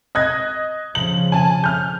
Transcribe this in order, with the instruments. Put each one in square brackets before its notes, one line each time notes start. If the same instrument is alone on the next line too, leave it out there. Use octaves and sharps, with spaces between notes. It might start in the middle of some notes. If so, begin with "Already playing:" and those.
[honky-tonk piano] D#5 F#6 G#6
[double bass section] C#3 F3 [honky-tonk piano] F#7
[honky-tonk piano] G#5 A5
F6 G6